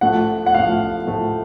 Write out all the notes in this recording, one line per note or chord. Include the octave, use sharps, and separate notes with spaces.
A2 F3 A3 F#5
F#5
A2 F3 A3 F5
A2 F3 A3